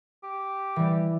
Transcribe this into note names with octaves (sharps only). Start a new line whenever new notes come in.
G4
E3 G3